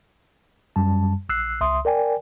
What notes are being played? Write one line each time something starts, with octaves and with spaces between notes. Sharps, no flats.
F#2 G3 A5
A#1 E6 F#6 C7
C#2 E5 C6 D#6
A#4 D5 G5 G#5